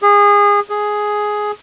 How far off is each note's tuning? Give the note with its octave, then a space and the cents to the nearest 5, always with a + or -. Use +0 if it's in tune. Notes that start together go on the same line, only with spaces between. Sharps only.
G#4 -25
G#4 +5